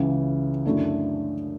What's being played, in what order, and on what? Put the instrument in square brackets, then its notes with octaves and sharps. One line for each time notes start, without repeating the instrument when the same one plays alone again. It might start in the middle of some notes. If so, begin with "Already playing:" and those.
Already playing: [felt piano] C#2 C#3 E3
F#2 D3 A3 E4